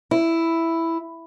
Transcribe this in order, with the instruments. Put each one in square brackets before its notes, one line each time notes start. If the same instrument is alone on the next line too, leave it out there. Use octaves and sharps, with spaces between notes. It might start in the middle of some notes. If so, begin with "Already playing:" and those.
[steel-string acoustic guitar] E4